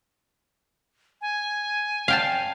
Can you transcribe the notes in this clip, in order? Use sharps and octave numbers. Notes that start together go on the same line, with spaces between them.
G#5
F5 G5 A5